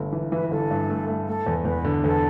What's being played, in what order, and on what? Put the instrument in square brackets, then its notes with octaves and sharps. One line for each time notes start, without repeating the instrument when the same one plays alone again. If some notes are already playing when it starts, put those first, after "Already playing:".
Already playing: [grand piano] G1 A3
E3
[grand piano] E3 [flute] B4
[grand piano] G1 [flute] A4
[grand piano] G2
A3
A3
[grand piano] A3 [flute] A4
[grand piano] E2
[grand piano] E2 [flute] B4
[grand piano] D3
[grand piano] E2 [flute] A4